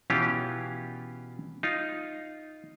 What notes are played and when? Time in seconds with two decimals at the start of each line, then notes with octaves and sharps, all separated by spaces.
0.10 B2 E3 C#4 F4 G4
1.63 D#4 F4